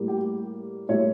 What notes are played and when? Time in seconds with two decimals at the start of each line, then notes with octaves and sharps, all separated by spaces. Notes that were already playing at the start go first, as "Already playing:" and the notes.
Already playing: A2 G3 A#3
0.08 G4
0.89 A2 G3 A#3 C#5 E5